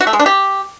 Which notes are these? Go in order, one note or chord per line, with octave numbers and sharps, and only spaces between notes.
F#4
A3
G#3
D4
G4